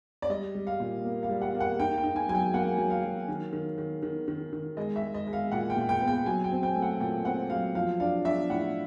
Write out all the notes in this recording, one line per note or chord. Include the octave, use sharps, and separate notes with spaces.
D5
G3 D#5
G3
F5
A#2
A#3
F5
G3
F#5
A#3
F#5
D#4 G5
G5
D#4
G#5
F#3 G#5
G5
A#3 F#5
F#3
F5
F#3
D#3
D#3
D#3
D#3
D#3
D#3
G#3 D#5
E5
G#3
D#5
G#3
F5
A#2 F#5
G5
A#2
G5
B3
G5
F#3 G#5
G5
C4
G5
A3
F#5
A#2 G5
C4 F#5
F#3 F5
F3 F5
D4 F5
D4 E5
A2 F#5